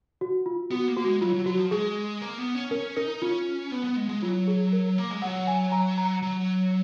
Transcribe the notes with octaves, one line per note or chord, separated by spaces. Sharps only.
F#4
F4
B3 F#4
A#3
F#4
G#3
F#3 F4
F#3
F#3 F#4
F3
G#3 G#4
A#3
B3
C#4
C#4 A#4
D#4 A#4
C#4 F4
B3
B3
G#3
G#3
F#3 F4
G#4
A#4
A#3
G#3
F#3 F#5
G#5
A#5
A#5
F#3